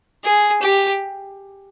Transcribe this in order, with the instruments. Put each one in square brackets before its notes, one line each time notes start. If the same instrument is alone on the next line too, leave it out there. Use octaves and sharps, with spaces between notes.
[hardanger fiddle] G#4
G4